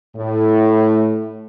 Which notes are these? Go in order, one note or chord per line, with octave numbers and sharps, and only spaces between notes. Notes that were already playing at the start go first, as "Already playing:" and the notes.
A2